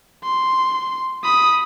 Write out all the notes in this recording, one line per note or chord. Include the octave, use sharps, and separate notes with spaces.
C6
B5 D#6